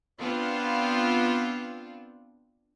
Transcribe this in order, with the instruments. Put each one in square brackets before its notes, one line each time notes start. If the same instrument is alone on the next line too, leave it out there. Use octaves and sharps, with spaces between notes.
[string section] B3 C4 D4 F4